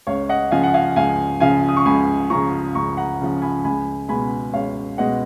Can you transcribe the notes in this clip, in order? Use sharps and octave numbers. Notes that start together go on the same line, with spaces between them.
C#2 C#5 F5
D#5 F#5
C#3 F3 F5 G#5
F#5
F5 G#5
C#2 F5 G#5
C#3 F3 F5 G#5
D#6
C#6
C#2 G#5 B5
C#3 F3 A#5 C#6
C#2 A#5 C#6
F#5 A#5
C#3 F3
G#5 B5
C#2 G#5 B5
B2 G#3 G#5 B5
C#2 C#5 F5
B2 G#3 D#5 F#5